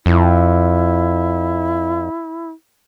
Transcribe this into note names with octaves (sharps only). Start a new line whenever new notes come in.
F2 E4